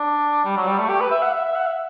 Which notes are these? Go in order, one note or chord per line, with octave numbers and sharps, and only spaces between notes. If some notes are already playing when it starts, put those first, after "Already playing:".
Already playing: D4
G3
F#3
G3
A3
G4
B4
E5
F#5
E5
E5
F#5
E5